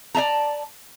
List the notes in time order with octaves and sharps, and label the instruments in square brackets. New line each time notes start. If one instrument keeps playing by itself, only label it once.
[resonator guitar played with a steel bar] D5 E5 A5 A#5